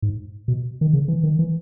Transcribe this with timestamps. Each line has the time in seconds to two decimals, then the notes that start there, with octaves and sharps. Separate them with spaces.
0.02 G#2
0.48 B2
0.81 D#3
0.93 C#3
1.08 E3
1.23 D#3
1.39 E3